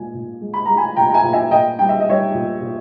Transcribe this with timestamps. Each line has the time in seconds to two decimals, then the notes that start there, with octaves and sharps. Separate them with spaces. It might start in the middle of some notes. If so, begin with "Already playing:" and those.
Already playing: A#2 G#3 G#5
0.14 A#2
0.41 G#3
0.54 B5
0.66 G#3 A#5
0.77 G#5 B5
0.96 A#2 G5 A#5
1.10 A#5
1.14 E5 G#5
1.23 A#2
1.33 E5 G#5
1.51 A#2 D#5 G5
1.79 G3 G5
1.89 E5
2.00 D#5
2.07 G3 C#5 E5
2.34 A#2
2.62 A#2